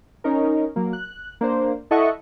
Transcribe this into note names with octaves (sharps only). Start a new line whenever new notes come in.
C#4 D#4 A#4
F#3 A#3
F#6
A#3 D4 C5
E4 A4 D#5 E5 F#5 C#6